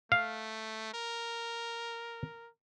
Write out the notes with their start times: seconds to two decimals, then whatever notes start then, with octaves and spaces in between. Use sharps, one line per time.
0.12 A3 F5
0.94 A#4